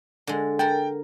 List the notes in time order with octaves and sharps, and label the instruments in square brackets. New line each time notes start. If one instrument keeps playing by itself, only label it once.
[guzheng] D3 G#3
[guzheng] A#4 F#5 A5 [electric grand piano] G5